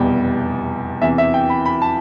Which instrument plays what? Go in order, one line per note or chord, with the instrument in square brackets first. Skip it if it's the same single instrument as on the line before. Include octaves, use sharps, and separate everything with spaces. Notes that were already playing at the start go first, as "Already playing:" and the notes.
Already playing: [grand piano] F1 E2 B2 G3 G5
E2 C3 E3 E5
E5
G5
B5
B5
A5